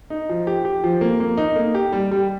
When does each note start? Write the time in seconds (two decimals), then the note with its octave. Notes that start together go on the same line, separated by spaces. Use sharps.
0.10 D#4
0.29 F3
0.47 G4
0.65 G4
0.84 F3
1.01 A#3
1.20 A#3
1.38 D#4
1.56 A#3
1.75 G4
1.93 G3
2.11 G3